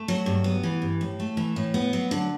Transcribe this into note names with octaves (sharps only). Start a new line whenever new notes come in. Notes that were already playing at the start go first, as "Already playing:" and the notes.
Already playing: A3
F#3
G2
B3
E3
G2
A2
A3
E3
A2
B3
F#3
D3